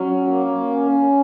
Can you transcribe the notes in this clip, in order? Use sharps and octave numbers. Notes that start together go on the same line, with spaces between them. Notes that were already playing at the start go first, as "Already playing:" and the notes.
Already playing: F#3 C#4
A#3
C#4